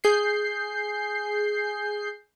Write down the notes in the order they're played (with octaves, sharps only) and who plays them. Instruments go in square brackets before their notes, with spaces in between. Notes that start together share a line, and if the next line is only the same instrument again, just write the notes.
[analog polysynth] G#4 G6 C7